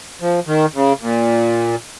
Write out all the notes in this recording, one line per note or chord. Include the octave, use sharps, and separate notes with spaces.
F3
D#3
C#3
A#2